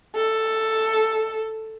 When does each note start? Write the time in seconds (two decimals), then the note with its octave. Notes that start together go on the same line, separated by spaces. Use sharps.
0.15 A4